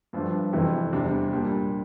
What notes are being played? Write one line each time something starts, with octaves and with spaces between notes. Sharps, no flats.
G2 F3 A3 D4
F2 C3 E3 A3
E2 C3 G3 D4
A#2 G3 A#3 D4